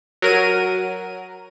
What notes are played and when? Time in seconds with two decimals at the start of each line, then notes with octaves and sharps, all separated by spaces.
0.22 F#3 A#4 D#7